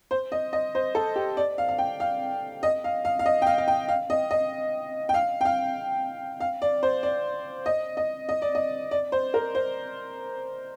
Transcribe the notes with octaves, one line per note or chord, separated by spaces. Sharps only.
C5
D#5
D#5
C5
A4
G4
D5
F5
F5
G5
F5
D#5
F5
F5
F5
D#5
G5
F5
F5
G5
F5
D#5
D#5
G5
F5
G5
F5
F5
D5
C5
D5
D#5
D#5
D#5
D5
D#5
D5
C5
A#4
C5